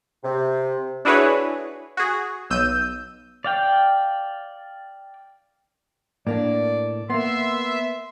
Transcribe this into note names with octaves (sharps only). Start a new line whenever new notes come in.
C3
D4 E4 F#4 G#4 B4 C#5
F#4 G#4
B1 E6 G6 D#7
D5 F5 G5
A2 A#3 D4 D5
A#3 B3 E5 C6